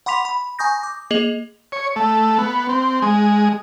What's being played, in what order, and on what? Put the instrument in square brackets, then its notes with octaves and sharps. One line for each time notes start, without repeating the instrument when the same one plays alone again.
[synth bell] F#5 B5 C6 D6 B6 F7
B5
G#5 A#5 C#6 D#6 G6 A#6
D6
A#3 G#4 D#5 F7 F#7
[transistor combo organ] C#5
A3
B3
C4
G#3